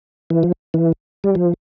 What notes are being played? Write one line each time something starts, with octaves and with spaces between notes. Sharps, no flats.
E3
F3
E3
G3
F3